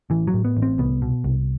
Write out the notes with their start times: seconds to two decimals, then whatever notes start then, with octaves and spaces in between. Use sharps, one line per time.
0.10 A1 E3
0.27 F#3
0.34 A2
0.45 B3
0.57 A1
0.62 C4
0.78 C2 B3
1.02 B2
1.24 C2